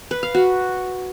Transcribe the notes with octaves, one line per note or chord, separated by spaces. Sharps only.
B4
F5
F#4